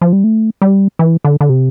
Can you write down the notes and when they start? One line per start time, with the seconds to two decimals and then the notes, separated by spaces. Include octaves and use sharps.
0.01 F3
0.13 G3
0.24 A3
0.62 G3
0.99 E3
1.24 D3
1.41 D3
1.49 C3